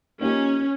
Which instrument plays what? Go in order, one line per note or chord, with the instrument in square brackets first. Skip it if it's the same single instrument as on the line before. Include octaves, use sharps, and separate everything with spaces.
[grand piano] F3 A#3 D#4 G4 A#4 [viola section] C#4